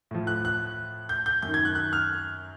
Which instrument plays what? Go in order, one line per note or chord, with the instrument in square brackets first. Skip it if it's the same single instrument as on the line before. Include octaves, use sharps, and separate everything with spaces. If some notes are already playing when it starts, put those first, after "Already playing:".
[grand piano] A2 F3
F#6
F#6
G6
G6
F#2 D#3 G6
G#6
F#6
F#6
F6